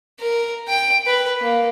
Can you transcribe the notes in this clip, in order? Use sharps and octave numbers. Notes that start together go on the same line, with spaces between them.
A#4
G5
B4
A#3